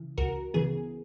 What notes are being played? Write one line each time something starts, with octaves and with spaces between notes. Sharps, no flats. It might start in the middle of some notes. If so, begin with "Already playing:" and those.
Already playing: C#3 E3
C#2 F#4 A#4
C#3 E3 B3 G#4